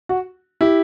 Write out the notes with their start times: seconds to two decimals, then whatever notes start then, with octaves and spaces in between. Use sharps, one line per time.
0.09 F#4
0.61 E4 G4